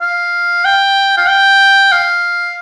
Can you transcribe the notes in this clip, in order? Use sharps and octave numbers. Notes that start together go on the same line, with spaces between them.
F5
G5
F5
G5
F5